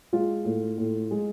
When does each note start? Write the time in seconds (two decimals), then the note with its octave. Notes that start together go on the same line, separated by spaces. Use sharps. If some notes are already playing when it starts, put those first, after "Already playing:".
0.13 G#3 F4
0.45 A2
0.78 A2
1.11 G#3